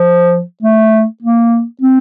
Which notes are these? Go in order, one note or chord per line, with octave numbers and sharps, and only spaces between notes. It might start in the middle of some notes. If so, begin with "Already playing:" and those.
Already playing: F3
A3
A#3
C4